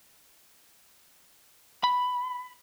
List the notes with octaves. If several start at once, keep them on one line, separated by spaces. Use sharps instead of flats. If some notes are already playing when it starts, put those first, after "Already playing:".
B5